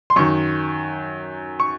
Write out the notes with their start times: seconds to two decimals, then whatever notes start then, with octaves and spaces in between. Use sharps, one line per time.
0.10 C6
0.16 F#2 D#3 C#6
1.60 C#6